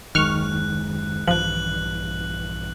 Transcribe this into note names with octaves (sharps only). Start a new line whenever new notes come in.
F#1 D#2 D#3 G#3 C#6 F6 F#6
A#1 G2 E3 F3 F#6 F#7